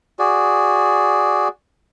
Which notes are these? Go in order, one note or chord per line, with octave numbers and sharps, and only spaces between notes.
F#4 G#4 D5